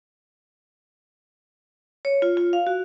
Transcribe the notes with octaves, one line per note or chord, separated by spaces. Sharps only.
C#5
F4
F4
F5
F#4